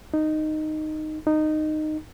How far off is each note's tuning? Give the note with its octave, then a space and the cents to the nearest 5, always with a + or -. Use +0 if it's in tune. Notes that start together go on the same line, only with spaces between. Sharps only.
D#4 -10
D#4 -15